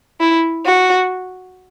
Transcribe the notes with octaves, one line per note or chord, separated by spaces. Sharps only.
E4
F#4